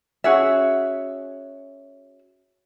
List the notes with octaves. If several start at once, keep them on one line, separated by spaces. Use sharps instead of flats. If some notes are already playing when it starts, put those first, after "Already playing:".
C#4 F#4 G#4 E5